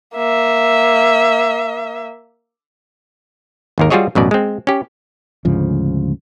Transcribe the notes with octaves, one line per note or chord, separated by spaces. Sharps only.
A#3 E5
G#1 D#2 A#4
G3 F4 F#4 G#4 C#5 D#5
A1 F#2 B2 D5
G#3 C4
C#4 G4
D2 G#2 C#3 F3